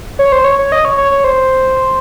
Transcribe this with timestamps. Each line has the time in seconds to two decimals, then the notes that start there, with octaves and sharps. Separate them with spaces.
0.19 C#5
0.32 C5
0.44 C#5
0.59 C#5
0.72 D#5
0.85 C#5
0.97 C#5
1.11 C#5
1.24 C5